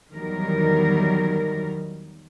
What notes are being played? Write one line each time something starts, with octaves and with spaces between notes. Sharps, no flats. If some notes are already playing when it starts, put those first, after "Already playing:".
E2 D#3 F#3 G3 A#4